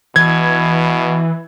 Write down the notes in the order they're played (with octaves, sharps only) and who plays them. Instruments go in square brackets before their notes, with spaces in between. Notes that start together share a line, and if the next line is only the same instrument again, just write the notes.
[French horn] B2 [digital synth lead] E3 [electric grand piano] G#6